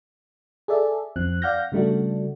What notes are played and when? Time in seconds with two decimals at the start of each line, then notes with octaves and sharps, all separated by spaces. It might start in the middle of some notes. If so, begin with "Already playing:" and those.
0.68 G#4 A4 D5 E5
1.16 F2 F3 C4 F#6
1.42 D5 F5 F#5 F6 G6 A#6
1.72 C#3 G3 A3 D4 F#4